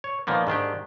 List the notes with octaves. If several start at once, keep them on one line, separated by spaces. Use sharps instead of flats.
C#5
A#2 D#3 F3 A#3 B3
G#2 D#3 D4 G4